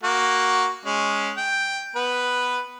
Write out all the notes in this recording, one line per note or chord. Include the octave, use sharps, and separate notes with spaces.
A#3 F#4
G#3 C#4
G5
B3 B4